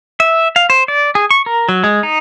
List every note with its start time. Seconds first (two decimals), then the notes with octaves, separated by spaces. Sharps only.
0.20 E5
0.56 F5
0.70 C5
0.88 D5
1.15 G#4
1.31 C#6
1.46 A#4
1.69 F#3
1.84 G#3
2.03 D#4